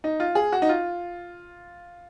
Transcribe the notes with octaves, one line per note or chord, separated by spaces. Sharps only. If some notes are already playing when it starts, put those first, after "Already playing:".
D#4
F4
G#4
F#4
D#4
F4